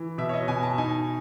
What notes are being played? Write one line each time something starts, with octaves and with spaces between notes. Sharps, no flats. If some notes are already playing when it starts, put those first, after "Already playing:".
Already playing: E3
B2 E5
C#5
D#5
B2 G#5
A5
D#4 G#5